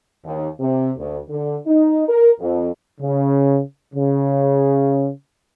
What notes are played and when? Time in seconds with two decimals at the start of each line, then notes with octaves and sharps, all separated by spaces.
0.25 D#2
0.60 C3
0.97 D2
1.30 D3
1.66 D#4
2.09 A#4
2.40 F2
3.01 C#3
3.94 C#3